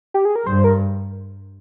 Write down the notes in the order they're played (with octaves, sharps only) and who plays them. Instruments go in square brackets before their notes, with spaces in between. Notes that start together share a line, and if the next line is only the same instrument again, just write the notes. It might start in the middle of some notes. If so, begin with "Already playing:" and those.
[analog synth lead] G4
G#4
A#4
[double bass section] G2 [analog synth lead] C5
[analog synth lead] A#4